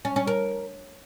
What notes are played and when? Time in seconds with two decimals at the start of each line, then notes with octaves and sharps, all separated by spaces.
0.05 C#4
0.16 C#4
0.27 A#4